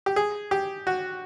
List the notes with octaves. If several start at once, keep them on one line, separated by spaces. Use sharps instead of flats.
G4
G#4
G4
F#4